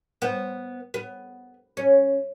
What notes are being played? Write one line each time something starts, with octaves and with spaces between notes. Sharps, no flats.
B3 C5
B3
C#4